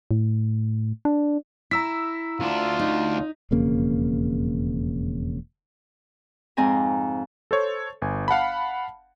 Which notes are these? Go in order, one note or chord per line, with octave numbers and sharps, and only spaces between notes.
A2
D4
E4 A#5 E6 B6
D2 D4 F4
D#4
E1 F2 C#3 A#3
F2 G#2 C4 D#4 G#5 A#5
A4 C5 C#5
G1 G#5
F5 F#5 A5 B5